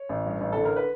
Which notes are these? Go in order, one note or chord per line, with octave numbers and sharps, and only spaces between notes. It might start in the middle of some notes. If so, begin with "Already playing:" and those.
Already playing: C#5
A1
G2
A1
D3 A4
A#4
B4